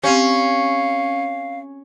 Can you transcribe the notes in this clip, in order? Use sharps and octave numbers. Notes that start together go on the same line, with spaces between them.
C4 C#4 G4 F5